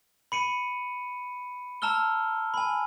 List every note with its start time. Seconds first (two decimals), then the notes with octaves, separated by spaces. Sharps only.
0.32 B5 C#7 D#7
1.82 A5 A#5 E6 F6 G7
2.54 G#5 B5